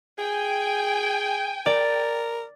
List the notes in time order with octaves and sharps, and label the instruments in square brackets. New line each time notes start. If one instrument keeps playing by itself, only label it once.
[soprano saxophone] G#4 [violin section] G5 G#5
[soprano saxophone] A#4 [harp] D5